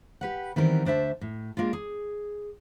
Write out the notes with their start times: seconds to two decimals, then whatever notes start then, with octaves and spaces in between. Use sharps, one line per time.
0.21 G4 B4 F#5
0.56 D#3 E3 G3 B3 C4 A#4
0.85 D2 D4 C5 E5 A5
1.21 A2
1.57 G#3 A#3 D4 F4
1.73 G#4